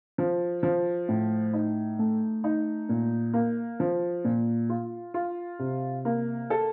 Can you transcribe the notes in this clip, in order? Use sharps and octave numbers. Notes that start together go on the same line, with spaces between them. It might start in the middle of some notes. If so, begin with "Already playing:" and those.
F3
F3
A2
D#4
A3
D#4
A#2
A#3
F3
A#2
F4
F4
C3
A#3
A4